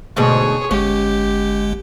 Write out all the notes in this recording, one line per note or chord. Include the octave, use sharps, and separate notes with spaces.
D2 G#2 B2 G#4 C#5
G1 G#3 C#4 G4